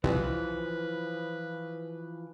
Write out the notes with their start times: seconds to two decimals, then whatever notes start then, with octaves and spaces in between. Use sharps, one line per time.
0.04 C2 E3 F3 B4